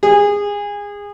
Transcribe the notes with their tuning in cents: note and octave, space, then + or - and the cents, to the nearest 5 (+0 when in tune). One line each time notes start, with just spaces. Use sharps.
G#4 -25